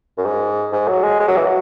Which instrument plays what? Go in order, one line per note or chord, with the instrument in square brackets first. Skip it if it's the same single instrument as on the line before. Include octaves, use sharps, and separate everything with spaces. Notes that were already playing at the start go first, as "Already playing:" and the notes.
[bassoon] F#2
G#2
G#2
F#3
G#3
G#3
F#3
E3
F#3